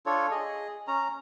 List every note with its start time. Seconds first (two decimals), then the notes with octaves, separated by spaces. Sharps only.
0.06 D4 F4 A4 C#5
0.31 G#4 D#5
0.87 C#4 A#5